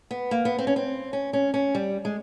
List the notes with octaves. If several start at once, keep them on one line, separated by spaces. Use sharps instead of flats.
B3
A#3
B3
C4
C#4
C4
C#4
C#4
C#4
G3
G#3